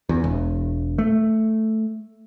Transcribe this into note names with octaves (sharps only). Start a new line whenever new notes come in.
E2
E1
A3